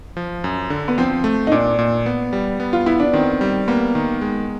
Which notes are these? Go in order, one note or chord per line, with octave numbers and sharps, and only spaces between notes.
F3
F#2
D3
B3
F3 C4
A3
D#4
A#2 D4
A#2
B3
G3
B3
F4
B3 E4
D4
D#3 C4
G3
A#3 B3
D#3
G#3